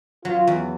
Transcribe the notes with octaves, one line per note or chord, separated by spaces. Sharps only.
F#3 F4
E2